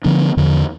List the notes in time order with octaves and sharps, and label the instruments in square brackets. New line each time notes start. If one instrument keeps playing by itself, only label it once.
[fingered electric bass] D3 F3 B3 D4
E2 D3 F3